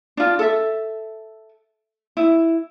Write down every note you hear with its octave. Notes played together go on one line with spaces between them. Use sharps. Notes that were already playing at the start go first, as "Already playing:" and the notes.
D4 F4
A4 E5
E4